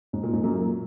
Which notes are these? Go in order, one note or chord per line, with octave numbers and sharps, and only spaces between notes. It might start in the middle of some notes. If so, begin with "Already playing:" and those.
G#2
A#2
G#2
F#2
A#2